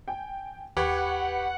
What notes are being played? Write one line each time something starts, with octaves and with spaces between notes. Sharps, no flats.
G5 G#5
D#2 G4 B4 F#5 C#6 G#6